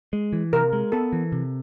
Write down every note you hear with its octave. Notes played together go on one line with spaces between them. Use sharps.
G#3
E3
C3 A#4
G#3
B3 A4
E3
C3